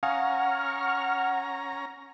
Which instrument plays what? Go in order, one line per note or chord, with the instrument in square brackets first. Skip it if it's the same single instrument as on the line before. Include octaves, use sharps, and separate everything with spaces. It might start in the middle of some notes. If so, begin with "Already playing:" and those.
[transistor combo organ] C#4 A#5 [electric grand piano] F5 G#5 D#6 [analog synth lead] F#5 [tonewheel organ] C#6 F6